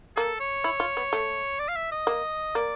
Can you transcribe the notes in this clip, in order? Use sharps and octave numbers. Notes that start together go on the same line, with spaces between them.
A#3 A4
C#5
E4
F4
B3
A3
D5
F5
E5
D#5
A#3
A#3 D5